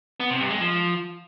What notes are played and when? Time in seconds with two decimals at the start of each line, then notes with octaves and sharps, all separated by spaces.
0.20 B3
0.30 C3
0.40 G2
0.50 G#3
0.60 F3